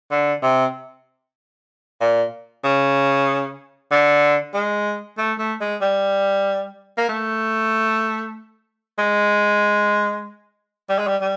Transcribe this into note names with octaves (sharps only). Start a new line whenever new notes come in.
D3
C3
A#2
C#3
D3
G#3
A3
A3
G#3
G3
A#3
A3
G#3
G3
G#3
G3
G3